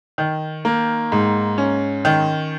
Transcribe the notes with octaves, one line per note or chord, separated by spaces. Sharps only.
D#3
A#3
G#2
C#4
D#3